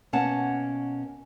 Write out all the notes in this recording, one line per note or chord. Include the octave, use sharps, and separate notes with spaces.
B2 A#3 C#4 F#5 A5